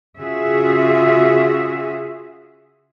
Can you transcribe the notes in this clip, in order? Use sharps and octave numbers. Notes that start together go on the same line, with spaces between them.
C#3 F4 F#4 G#4 E5